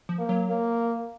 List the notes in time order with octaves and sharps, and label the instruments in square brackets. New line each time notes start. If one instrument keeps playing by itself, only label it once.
[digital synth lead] F3
[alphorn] A#3
[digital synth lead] F#3
[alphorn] A#3